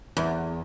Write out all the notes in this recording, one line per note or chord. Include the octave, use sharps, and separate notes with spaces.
E2